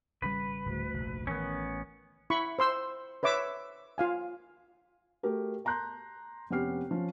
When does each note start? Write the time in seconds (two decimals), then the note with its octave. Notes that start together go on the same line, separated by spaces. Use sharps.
0.22 G#1 C#3 G3 B4
0.66 D1 D2
0.94 F1 A#1
1.27 A1 D#3 B3 C#4
2.30 E4 B5 C#6
2.59 C5 C6 E6
3.23 B4 C#5 E5 D6 E6
3.98 F4 F5 G#5
5.23 A3 F#4 G4 A4 A#4
5.65 A5 A#5 C6 F#6 G6
6.50 F1 B3 C#4 G4 F6 C7
6.91 F3 C#4